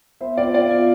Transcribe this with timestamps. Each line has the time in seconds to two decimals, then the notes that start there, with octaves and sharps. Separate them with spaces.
0.21 B3 C5 E5
0.37 F4 C5 D5 F5
0.54 B3 D5 F5
0.71 F4 C5